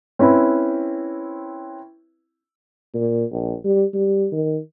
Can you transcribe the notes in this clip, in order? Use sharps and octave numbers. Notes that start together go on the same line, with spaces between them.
C4 C#4 E4 B4
A#2
A#1
G3
G3
D#3